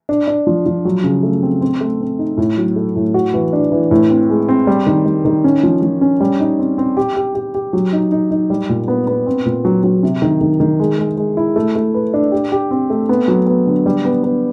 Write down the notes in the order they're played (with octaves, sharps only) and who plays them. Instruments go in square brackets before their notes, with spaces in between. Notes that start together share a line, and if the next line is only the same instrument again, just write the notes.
[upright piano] D4
D4
F3
F3
F#3
C#3
A3
C4
C4
A3
C4
D#4
A2
F#3
A3
A2
F#4
E3
D4
E3
A2
C4
G#3
C4
G3
D#3
G3
D#3
C#4
F3
F3
C#4
G3
D#4
C4
C4
G4
G4
G4
G4
F#3
D#4
D#4
D#4
G3
A#2
B3
B3
C4
A#2
F#3
F#3
C3
D#3
D#3
D#3
G#3
G#3
G#3
E4
A3
A3
B4
D4
G4
G4
C4
A3
B3
F#3
B3
D3
G3
B3
B3